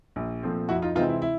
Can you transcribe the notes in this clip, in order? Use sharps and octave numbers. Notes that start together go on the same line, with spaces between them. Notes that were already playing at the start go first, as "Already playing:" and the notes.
A#1
A#2 F3 A3 C4
F2 E4 F#4
D#4 F4
C3 E3 G#3 C4 D#4 F4
E4
E4